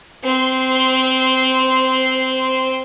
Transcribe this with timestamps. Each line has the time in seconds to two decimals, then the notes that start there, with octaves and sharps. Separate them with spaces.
0.24 C4 C6